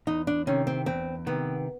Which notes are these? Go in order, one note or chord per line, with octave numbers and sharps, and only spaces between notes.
E2 D#4
D4
C3 D#3 C#4
C4
E2 C4
C3 D#3 B3